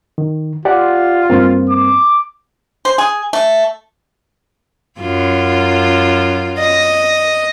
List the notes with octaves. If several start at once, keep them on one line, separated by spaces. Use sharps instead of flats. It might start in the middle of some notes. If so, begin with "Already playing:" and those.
D#3
F4 G4 D5 F#5
G2 A#3 C4
D6
C5
G#4
A3
F#2 F4
D#5